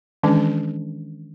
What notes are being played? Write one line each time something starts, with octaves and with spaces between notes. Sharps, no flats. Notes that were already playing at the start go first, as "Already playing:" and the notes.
D#3 E3 G#3 C#4 D4